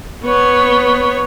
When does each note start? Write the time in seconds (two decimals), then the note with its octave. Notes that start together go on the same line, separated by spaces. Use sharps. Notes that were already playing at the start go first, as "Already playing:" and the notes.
0.23 B3 C#5